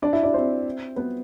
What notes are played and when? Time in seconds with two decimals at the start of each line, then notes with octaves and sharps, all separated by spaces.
0.02 D4 D5
0.13 E4 E5
0.23 D4 D5
0.34 C4 C5
0.96 B3 B4